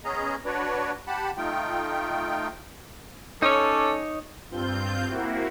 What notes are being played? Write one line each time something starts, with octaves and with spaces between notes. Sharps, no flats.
B3 C#4 G#4 D#5 A#5
D4 F#4 B4 C#5 D5
G4 F#5 A5 B5
A3 D#4 F4 G5
C#4 D#4 A4 C#5 D6
G2 C4 F4 G6
A#3 C4 E4 F#4